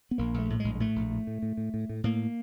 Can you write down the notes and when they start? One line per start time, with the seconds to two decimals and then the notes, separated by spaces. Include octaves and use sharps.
0.11 B3
0.18 A#1 A#3
0.34 A#1 A3
0.50 A2
0.60 A#1 G#3
0.75 G#3
0.80 A2 A3
0.96 A#1
1.11 A2
1.27 A2
1.42 A2
1.57 A2
1.74 A2
1.89 A2
2.04 A2 A#3